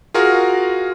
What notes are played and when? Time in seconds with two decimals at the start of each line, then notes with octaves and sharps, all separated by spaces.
0.14 F4 F#4 G#4 A#4 F5